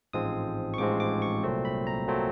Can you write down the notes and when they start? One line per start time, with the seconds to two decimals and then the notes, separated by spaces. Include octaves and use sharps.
0.13 A1 G#2 F3 G#3 C4 D#6
0.74 C#6
0.78 A1 G#2 F3 G#3 C4 D6
1.00 D6
1.22 C#6
1.43 C2 A#2 F#3 A3 C4
1.65 B5
1.87 A#5
2.08 A#2 F#3 A3 C4